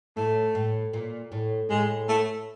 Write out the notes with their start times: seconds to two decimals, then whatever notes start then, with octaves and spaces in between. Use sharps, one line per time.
0.17 A2 A3
0.55 A2
0.93 A#2
1.32 A2
1.70 A2 G#3
2.09 A3